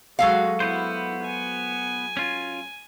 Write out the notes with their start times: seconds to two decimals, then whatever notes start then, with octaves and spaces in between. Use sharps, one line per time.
0.19 F#3 G#3 F#4 A4 F5
0.60 B3 E4 C5
1.24 G#5
2.17 C#4 F4